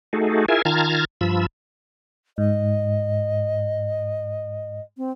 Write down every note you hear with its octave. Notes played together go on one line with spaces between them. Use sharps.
A3 D#4 F#4 G#4 A4
E4 F4 G#4 A#4 E5 G#5
D#3 F4 A5 A#5 F6 G#6
G2 F3 F4 B5 E6
G#2 D#5
C4